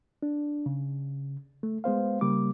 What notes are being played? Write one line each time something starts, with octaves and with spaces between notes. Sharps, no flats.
D4
C#3
A3
G#3 B3 C5 F5
C#3 G3 A#3 D6